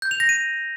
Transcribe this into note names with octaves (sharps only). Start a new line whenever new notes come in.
G6
F7
A#6
D#7